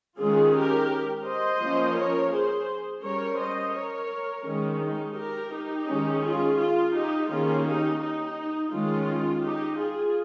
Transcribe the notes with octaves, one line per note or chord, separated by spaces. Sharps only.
D#3 G#3 C#4 F4 G#4
G4 A#4
C5 D#5
F3 A#3 C#4
A#4 C#5
G#4 C5
G3 C#4 A#4 C#5
C5 D#5
A#4 C#5
D#3 G#3 C#4
D#4
G4 A#4
D#4 G4
D#3 G#3 C#4
F4 G#4
F4
D#4 G4
D#3 A#3 C#4 F4 G#4
D#4 G4
D#4
D#3 G#3 C#4 F4
D#4 G4
F4 G#4